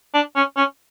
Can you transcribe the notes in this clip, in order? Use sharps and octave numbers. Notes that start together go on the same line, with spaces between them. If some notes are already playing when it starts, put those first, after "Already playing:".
D4
C#4
C#4